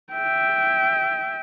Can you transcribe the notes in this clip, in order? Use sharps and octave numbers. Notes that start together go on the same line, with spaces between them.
E5 G5